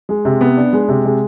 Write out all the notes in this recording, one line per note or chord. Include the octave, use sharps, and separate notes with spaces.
G#3
C3
B3
D4
G#3
C3
G#3